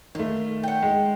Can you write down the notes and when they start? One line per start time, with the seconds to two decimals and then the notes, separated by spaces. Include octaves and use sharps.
0.15 D#3 A3 F4
0.64 F#5 G5
0.83 G#3